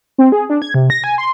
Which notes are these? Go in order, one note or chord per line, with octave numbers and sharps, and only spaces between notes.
C4
G#4
D4
G#6
C3
A#6
G#5
C6